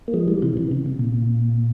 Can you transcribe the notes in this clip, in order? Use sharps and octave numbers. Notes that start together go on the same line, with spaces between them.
A#3
F3 G#3
E3 G3
C3 E3
C3 E3
C#3
C3
A#2